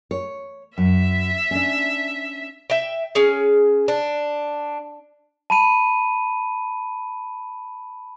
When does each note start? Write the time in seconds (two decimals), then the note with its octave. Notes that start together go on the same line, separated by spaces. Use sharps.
0.11 C#5
0.78 F#2 E5
1.51 C#4 D4
2.70 E5 G5
3.15 C#4 G#4
3.88 D4
5.50 A5 B5 D#7